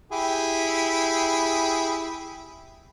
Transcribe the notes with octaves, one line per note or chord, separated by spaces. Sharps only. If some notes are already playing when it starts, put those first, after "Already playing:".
E4 G4 G#4